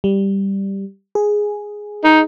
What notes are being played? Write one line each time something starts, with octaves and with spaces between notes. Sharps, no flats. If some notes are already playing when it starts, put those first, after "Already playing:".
G3
G#4
D#4